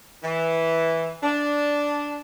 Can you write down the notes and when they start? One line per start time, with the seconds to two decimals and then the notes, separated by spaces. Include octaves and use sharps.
0.24 E3
1.23 D4